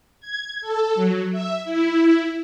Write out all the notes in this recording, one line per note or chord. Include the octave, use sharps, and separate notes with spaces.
G#6
A4
F#3
E5
E4